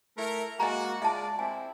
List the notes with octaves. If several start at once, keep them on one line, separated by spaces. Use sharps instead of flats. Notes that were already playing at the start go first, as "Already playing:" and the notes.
A3 E4 A#4
G#3 A#3 F#4 D#5 G#5 A#5
G#3 F4 D5 E5 A5
C4 E4 G#5